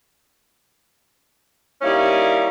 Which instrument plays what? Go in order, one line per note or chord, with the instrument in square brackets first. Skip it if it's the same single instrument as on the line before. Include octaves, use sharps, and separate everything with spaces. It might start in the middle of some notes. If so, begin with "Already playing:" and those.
[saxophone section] G3 A#3 C#4 D#4 E4